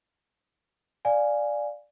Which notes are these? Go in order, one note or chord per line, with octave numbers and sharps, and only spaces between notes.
D5 F5 G#5